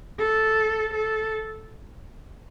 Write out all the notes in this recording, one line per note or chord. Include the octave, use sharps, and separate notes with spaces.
A4
A4